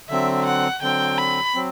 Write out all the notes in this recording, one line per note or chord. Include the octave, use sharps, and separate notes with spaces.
D3 F#3 C4 E5
F#5
D3 F#3 C4 G5
B5
F#3 C4